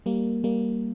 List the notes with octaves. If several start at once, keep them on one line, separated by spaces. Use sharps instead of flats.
G3 A#3
G3 A#3